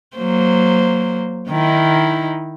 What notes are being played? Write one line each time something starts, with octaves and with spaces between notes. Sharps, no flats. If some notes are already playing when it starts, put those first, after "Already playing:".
F#3 A#3 C5
D#3 D#4 E4